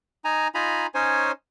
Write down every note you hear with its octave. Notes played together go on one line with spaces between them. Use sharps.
D#4 G#5 A#5
D#4 F4 G#5 A#5 B5
C#4 D#4 C5 C#5 G#5